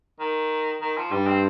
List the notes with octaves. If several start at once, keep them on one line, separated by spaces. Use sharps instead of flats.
D#3
D#3
F3
G2 G3
C4